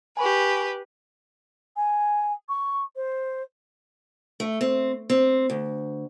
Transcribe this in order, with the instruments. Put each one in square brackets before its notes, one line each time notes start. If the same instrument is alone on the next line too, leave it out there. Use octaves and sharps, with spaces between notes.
[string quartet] G4 B4 [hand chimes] G#5 B5 C#6
[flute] G#5
C#6
C5
[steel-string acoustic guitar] A3
C4
C4
D2